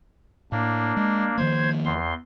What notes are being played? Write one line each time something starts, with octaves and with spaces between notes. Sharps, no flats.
A2 A#3 D4
G#3
D#3 F3 A#3 C5 G#6
E2 C6